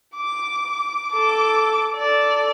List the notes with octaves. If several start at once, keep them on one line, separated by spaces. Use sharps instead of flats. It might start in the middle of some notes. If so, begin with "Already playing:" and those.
D6
A4 D6
A4 D5